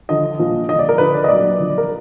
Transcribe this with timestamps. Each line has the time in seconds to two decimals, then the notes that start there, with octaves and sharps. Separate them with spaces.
0.09 D3 F3 D#5
0.39 A#2 F3
0.69 D3 F3 D#5
0.79 D5
0.89 A#4
0.98 D3 F3 B4
1.14 D5
1.24 D#5
1.29 A#2 F#3 D5
1.59 D3 F3
1.78 A#4